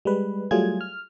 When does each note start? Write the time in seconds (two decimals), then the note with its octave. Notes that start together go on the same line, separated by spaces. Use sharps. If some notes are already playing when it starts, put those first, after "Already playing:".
0.05 G3 G#3 B4
0.51 F#3 G3 A3 F4 G#4 G#6
0.81 F6